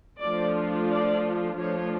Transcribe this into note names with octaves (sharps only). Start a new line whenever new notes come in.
F3 A3 D4 F4 D5
D5
F3 A3 D4 F4 C#5